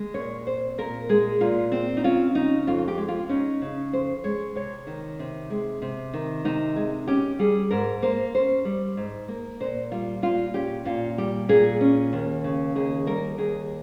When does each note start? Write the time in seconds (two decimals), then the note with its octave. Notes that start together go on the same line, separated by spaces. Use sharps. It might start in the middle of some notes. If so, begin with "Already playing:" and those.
Already playing: G#3
0.14 A#2 C#5
0.46 C4 C5
0.78 A#2 A#4
1.09 G#3 G#4
1.41 A#2 F4
1.72 C4
1.97 D#4
2.04 C#4 F4
2.35 C#3 D#4
2.67 F2 F4
2.88 G4
2.98 G#3
3.08 F4
3.29 C#4 D#4
3.62 C#3
3.93 F2 C5
4.24 G#3 C#5
4.55 C3 C#5
4.87 D#3
5.19 C3
5.50 G#3
5.82 C3
6.14 D#3
6.45 C3 D#4
6.76 G#3
7.08 C#4 G4
7.39 G3 G#4
7.71 G#2 A#4
8.02 A#3 C5
8.34 C#4 C5
8.65 G3
8.97 G#2
9.28 A#3
9.60 A#2 C5
9.92 G3 F4
10.22 A#2 F4
10.54 C#4 G4
10.85 A#2 F4
11.18 G3 G4
11.49 A#2 G#4
11.81 C#4
12.13 D#2
12.44 C#3
12.75 D#2 G#4
13.06 G3 A#4
13.38 D#2 G#4